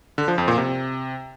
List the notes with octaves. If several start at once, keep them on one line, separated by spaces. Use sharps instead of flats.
D3
F3
F2
A#2
C3